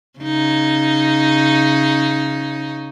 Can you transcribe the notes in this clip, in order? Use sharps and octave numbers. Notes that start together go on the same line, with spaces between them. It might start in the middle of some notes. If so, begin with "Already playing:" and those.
C#3 D#4